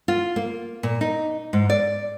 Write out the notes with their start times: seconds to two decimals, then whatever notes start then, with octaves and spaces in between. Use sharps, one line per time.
0.08 F4
0.36 A#3
0.83 A#2
1.01 D#4
1.53 G#2
1.70 D5